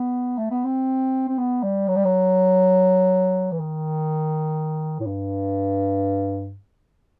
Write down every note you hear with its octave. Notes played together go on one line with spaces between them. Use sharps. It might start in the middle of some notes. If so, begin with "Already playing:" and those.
Already playing: B3
A3
B3
C4
C4
B3
G3
F#3
G3
F#3
E3
D#3
A2
G2